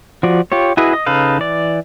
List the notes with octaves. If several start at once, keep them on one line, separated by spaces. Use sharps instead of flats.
F3 F#4 D5
F4 G4 C#5
E4 F#4 G#4 B4 D#5
D#5
C#3 D#4 A4 B4 F5
E3 D5